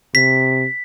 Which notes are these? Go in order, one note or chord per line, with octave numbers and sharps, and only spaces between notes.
C3 B6